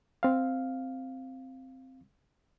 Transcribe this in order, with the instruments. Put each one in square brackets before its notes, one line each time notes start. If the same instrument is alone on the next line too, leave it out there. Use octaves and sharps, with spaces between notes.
[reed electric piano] C4 F5